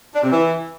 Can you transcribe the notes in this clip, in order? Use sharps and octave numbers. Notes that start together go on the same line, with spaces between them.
D4
C3
E3